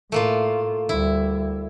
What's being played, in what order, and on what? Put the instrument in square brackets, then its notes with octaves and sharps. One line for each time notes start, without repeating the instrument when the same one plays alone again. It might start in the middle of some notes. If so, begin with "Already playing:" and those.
[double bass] A2 [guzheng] A3 A#3 F4
[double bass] D2 G3 [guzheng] E4